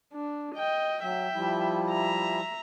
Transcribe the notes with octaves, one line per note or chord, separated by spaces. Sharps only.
D4
D#5 G5
F#3 E5 G5
F3 G3 E4
E5 A#5